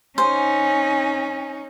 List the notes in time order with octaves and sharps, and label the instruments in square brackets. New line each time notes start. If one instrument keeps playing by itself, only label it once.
[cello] C#4 D#4 [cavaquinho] C5 [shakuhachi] G#5